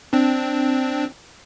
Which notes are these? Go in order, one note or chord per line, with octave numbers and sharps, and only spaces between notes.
C4 D4